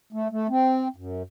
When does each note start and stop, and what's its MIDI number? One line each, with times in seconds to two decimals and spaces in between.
0.13 0.28 57
0.31 0.47 57
0.49 0.88 60
0.96 1.23 42